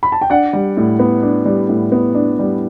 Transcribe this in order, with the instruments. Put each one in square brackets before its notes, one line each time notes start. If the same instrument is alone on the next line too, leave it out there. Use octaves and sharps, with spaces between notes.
[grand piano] B5
A5
G5
D4 D5 F#5
G3
A2
B3
D4
G3
A2
B3
D4
G3